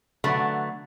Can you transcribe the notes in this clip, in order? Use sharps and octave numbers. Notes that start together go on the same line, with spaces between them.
D3 F#3 A3 B3